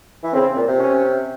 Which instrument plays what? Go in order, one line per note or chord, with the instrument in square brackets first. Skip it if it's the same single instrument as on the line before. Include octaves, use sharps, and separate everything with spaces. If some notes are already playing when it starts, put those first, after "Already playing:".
[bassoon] E3
[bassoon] C#3 [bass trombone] C4
[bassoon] A#2
C3
[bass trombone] C#4